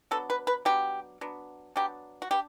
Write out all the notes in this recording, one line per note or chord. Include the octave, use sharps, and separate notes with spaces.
F#3 B3 D4 A4
B4
B4
F#3 B3 D4 G4
F#3 B3 D4
F#3 B3 D4 G4
F#4
B3 D4 G4